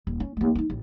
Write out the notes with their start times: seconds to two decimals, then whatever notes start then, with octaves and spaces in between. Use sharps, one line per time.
0.07 D#1
0.20 C#4
0.37 D#2 A3
0.55 C#4 D#4
0.70 A1